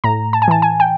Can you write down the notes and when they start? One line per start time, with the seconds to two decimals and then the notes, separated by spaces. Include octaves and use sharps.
0.04 A2 A#5
0.33 A5
0.42 G#5
0.48 E3 A5
0.62 G#5
0.80 G5